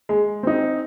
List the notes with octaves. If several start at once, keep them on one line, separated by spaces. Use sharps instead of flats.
G#3
C4 D#4